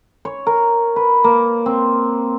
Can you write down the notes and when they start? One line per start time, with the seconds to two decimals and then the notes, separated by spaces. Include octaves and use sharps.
0.25 C#5
0.47 A#4
0.96 B4
1.24 A#3
1.66 C4